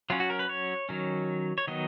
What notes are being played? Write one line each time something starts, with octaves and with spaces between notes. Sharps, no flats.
F#3 C#4 F4
F#4
A#4
B4
C#5
D#3 F#3 C#4
C#5
D#3 F#3 B3 D#5